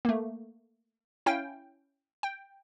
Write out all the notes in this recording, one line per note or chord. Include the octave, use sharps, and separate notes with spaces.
A3 A#3
C#4 E4 F5 G5 G#5
G5